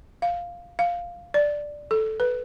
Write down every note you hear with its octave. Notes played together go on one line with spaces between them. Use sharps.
F5
F5
D5
A4
B4